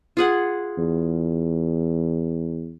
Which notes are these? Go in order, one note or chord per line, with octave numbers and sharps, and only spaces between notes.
F4 G#4 F#5
E2